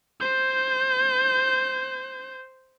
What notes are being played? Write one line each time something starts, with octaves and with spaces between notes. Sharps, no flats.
C5 G6